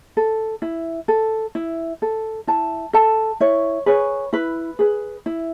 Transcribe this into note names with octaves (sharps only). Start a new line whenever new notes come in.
A4
E4
A4
E4
A4
E4 A5
A4 A5
E4 C#5
G#4 B4 C#5
E4 B4
G#4 B4
E4